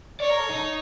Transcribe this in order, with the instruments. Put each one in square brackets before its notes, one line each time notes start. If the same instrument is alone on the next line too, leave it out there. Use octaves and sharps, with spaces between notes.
[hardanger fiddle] C#5 [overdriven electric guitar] D5
[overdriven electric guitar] A#4
A4
D#4